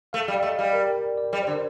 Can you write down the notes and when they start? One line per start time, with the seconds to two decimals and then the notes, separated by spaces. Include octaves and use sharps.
0.13 A3 F5
0.28 G3 F5
0.43 A3 D#5
0.58 G3 F5
0.73 A#4
0.88 A#4
1.18 D5
1.33 G3 D5
1.42 C5
1.47 D3
1.52 A#4